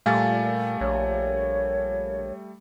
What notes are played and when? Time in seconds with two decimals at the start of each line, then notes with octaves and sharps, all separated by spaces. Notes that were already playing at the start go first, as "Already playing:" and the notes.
0.06 A#2 G3 A3 F5 G#5 A6
0.81 A#1 C#5